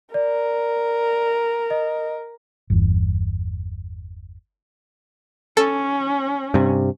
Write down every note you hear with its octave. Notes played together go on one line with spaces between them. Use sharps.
A#4 D5
D#5
G1 E2
C#4 A4
G2 C3